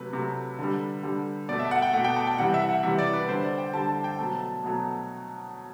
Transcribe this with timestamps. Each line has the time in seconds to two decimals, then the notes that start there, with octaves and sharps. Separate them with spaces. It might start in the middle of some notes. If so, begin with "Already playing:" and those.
Already playing: C3 F#3 A3 B4
0.13 C3 F#3 A3
0.59 D3 G3
1.03 D3 G3
1.49 B2 A3 D5
1.60 E5
1.71 F#5
1.82 G5
1.93 B2 A3 F#5
2.04 G5
2.17 A5
2.27 G5
2.38 C3 E3 G3 F#5
2.54 E5
2.69 F#5
2.83 C3 E3 G3 E5
2.99 D5
3.13 B4
3.29 D3 G3 C5
3.44 D5
3.58 G5
3.73 D3 G3 A5
3.89 A5
4.04 G5
4.19 B2 F#3 A3 A5
4.64 B2 F#3 A3